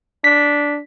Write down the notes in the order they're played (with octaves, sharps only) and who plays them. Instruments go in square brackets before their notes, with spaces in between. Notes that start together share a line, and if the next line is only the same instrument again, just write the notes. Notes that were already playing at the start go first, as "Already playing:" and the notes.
[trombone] D4 [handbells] B6